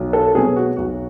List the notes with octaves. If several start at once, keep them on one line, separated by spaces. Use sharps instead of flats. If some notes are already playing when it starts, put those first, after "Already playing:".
Already playing: B1
A4
B2 F#3 B3 G#4
F#4
B1 F#4